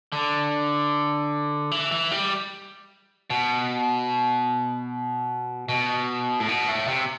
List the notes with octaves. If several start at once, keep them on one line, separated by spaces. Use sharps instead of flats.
D3
E3
E3
G3
B2
B2
A2
B2
A2
C3